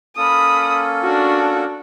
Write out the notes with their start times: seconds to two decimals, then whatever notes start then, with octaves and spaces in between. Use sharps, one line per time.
0.17 A#3 C#4 A4 B5 D#6
1.04 D4 F#4